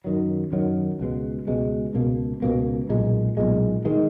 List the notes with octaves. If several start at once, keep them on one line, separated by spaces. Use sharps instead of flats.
F#2 D#3 F#3
F#2 D#3 F#3
C#2 B2 G#3
C#2 B2 G#3
C#2 B2 A#3
C#2 B2 A#3
B1 A#2 G#3
B1 A#2 G#3
D#3 G#3